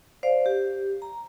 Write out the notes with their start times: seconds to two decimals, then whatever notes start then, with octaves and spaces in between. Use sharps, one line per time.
0.23 C5 D5 F5
0.46 G4
1.02 A#5